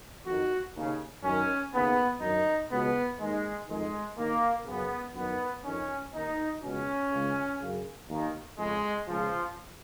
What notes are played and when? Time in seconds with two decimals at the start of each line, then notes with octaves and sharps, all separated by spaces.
0.25 F2 D#3 F#4
0.75 D#2 C#3
1.23 F#2 D#3 C#4
1.73 D#2 C#3 B3
2.21 F#2 D#3 D#4
2.71 C#2 B2 B3
3.19 D#2 D#3 G#3
3.68 F2 D#3 G#3
4.17 D#2 D#3 A#3
4.66 F#2 C#3 B3
5.15 F#2 D#3 B3
5.64 F2 D#3 C#4
6.14 D#2 D#3 D#4
6.62 C#2 B2 C#4
7.12 C#2 C#3
7.60 F#2 C#3
8.10 D#2 D#3
8.58 F2 C#3 G#3
9.07 C#2 C#3 F3